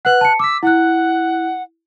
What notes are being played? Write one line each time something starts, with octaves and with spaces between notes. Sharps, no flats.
B4 F#5 F#6
A5 C#7
D6 E6 B6
E4 F#5 F#6